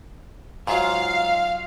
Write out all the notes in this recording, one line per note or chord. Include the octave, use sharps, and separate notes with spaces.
G#2 F#3 F4 F5